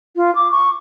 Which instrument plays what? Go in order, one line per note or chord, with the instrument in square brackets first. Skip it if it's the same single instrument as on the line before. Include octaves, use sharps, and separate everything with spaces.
[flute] F4
D6
C#6